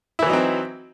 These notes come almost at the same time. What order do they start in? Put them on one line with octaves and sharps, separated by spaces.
E4 E3 F#3 D#4 C4